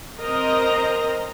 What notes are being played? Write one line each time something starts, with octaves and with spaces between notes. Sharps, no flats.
C4 A#4 C5 D#5 A#5